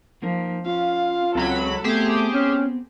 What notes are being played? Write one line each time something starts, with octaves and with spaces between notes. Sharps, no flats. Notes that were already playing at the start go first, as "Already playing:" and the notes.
F3 A#3 D#4 A#4
C#4 F4 F5
C#2 F#3 C4 A4 G5 B5
A3 B3 C4 G4 G#4 C5
C#4